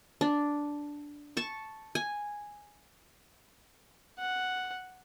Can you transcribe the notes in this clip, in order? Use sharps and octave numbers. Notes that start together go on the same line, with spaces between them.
D4
A5 C#6
G#5
F#5